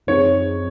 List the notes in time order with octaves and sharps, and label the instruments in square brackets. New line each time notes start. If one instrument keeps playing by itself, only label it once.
[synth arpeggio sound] F#2 F3 C4 D#4 G#4 [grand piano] C#5